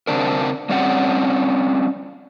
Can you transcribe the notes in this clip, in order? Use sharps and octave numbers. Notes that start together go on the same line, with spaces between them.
C#3 C4 D4 A#4
G3 C4 C#4 D5 F5 F#5